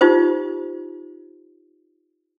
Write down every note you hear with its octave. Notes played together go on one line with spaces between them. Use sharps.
D#4 F4 G4 C5